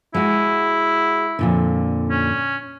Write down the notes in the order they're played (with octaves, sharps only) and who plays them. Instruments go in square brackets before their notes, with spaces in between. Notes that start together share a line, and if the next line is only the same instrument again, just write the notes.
[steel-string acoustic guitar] G#3 F#4 [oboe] E4
[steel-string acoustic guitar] F2 A#2 D3
[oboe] C#4